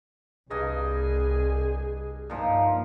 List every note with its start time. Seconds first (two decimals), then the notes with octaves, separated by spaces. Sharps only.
0.50 C2 G2 G#4 D#5
2.30 G2 A#2 F3 D#4